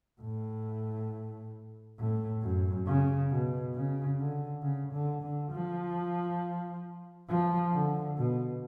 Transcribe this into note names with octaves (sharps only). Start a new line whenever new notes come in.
A2
A2
F#2
C#3
B2
C#3
D3
C#3
D3
D3
F3
F3
D3
B2